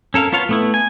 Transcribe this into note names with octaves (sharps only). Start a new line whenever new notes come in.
C#4 A4 A#4 F5
B3 F4 C#5 F5
A3 B3 E4
G#5